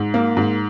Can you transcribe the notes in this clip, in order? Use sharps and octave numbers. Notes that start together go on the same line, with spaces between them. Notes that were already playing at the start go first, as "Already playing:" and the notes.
Already playing: G#2
A#3
G#2